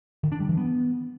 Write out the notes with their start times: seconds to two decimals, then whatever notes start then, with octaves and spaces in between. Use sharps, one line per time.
0.23 D#3
0.32 D4
0.40 G3
0.49 E3
0.57 B3